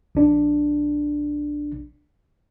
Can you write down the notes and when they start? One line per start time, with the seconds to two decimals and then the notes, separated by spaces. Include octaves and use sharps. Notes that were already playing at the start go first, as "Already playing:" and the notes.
0.15 A#1 D4